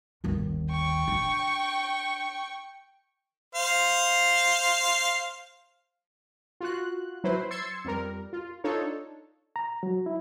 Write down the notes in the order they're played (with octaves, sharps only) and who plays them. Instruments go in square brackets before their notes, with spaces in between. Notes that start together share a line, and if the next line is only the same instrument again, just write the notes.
[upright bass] G1 D#2
[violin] G5 C#6
[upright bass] D4
[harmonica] C5 F5
[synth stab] F4 F#4 F#6
F#3 E4 B4 C5
C6 E6 G#6 A6 C#7
F2 G3 A#4
F4
D4 D#4 F4 A4 C#5
[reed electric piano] A#5
F#3
E4